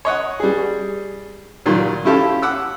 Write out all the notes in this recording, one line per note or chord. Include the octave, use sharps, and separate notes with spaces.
C#5 D#5 F#5
G3 G#4
A#2 D#3 F#3 G3
C#4 E4 F4 G4 A4
F#5 D6 E6